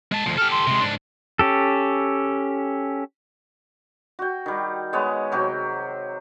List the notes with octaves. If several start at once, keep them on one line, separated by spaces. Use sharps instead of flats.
G#3 A5
D2 F3
G4 A4 F6
C6
C3 G#3
G#2 D4
C#4 G4 A4
F#4 G5
D#3 G3
G#3 B3 C#5
C3 F#3 G4